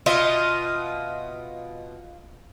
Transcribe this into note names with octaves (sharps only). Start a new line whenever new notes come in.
B2 F4 D#5 E5